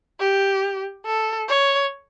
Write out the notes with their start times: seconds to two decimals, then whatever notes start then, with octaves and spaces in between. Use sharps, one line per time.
0.19 G4
1.06 A4
1.48 C#5